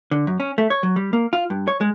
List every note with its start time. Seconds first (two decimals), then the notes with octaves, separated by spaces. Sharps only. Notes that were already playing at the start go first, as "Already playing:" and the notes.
0.11 D3
0.27 F#2
0.40 C#4
0.58 A3
0.70 C#5
0.83 F#3
0.96 G3
1.13 A#3
1.33 F4
1.50 G2
1.68 C#5
1.81 G#3